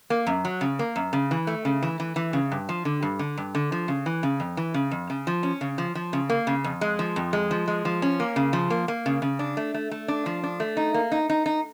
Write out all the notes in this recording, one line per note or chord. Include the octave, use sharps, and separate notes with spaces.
A#3
F#2
F#3
C#3
A#3
F#2
C#3
E3
A3
C#3
E3
E3
E3
C#3
G2
F3
D3
G2
D3
G2
D3
F3
C#3
E3
C#3
F2
E3
C#3
F2
C#3
F3
C#4
C#3
F3
F3
C#3
A#3
C#3
F2
G#3
F3
F2
G#3
F3
G#3
F3
C#4
A#3
C#3
F3
A#3
A#3
C#3
C#3
D4
A3
A3
A3
D4
F3
D4
A3
D#4
A#3
D#4
D#4
D#4